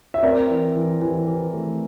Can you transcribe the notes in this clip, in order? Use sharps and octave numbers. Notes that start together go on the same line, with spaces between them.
E5
C4 A#4 D5
E3
E3
E3
E3
A3